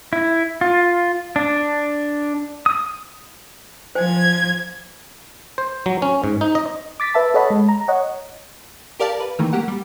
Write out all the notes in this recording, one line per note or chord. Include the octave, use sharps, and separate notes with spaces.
E4
F4
D4
D#6
F3 C5 G#5 G#6
C5
F#3
C#4
G#2
D#4
D#5
D6 A6 B6
B4 E5 A5
A4 C#5 D#5 F#5 A5 B5
G#3
A#5
C#5 D#5 F#5
G4 A#4 D5 F5 A5
B4
D#3 E3 A3 A#3
F#3 A#3 G4 F#5
G3